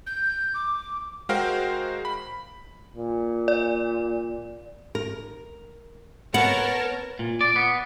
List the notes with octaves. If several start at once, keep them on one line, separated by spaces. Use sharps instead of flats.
G6
D6
G#3 F#4 A#4 C5 F5 G5
B5
A#2
D5
A#4
B3 A#4 C#5 F#5 A5
A#2
D5
B3